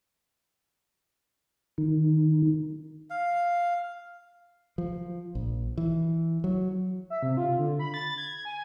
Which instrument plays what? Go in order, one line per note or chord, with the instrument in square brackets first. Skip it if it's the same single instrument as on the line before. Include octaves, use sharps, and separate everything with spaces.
[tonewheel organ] D#3
[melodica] F5
[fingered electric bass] F3
A#1
E3
F#3
[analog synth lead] E5
C3
F4
D3
B5
A6
G#6
G#5